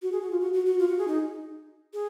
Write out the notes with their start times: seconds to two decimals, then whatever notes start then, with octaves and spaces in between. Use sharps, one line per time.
0.02 F#4
0.12 G#4
0.21 F#4
0.31 F4
0.40 F#4
0.53 F#4
0.66 F#4
0.79 F4
0.88 F#4
0.98 G#4
1.07 D#4
1.93 G#4